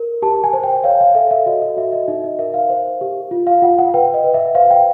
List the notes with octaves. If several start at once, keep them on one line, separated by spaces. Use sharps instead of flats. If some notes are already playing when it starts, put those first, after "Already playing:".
Already playing: A#4
G4 A5
G#5
C5
G5
C#5 F5
F5
A4 E5
E5
F#4 D#5
D#5
F#4 E5
D#5
D#4 E5
D#5
A#4 E5
F5
C5
G4
F4
F5
F4 F#5
F#5
B4 G5
D#5
B4
E5
C5 F5
G5